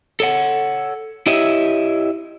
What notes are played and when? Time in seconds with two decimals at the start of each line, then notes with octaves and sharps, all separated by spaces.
0.20 A4 C#5 F#5
1.26 E4 G4 C#5 D#5 E5